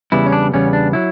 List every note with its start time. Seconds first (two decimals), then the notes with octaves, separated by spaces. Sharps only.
0.12 E2 C#3 G3 B3 E4
0.26 C#4
0.32 D4
0.53 E2 C#3 G3 B3 C#4
0.73 D4
0.93 F#3 E4